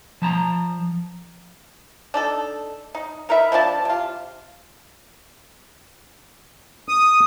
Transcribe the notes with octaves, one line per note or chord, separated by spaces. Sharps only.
F3 A5 A#5
D4 D#4 A4
D#4
D#4 A#4 B4 E5
F3 C4 D4 A5
C3 F4
D#6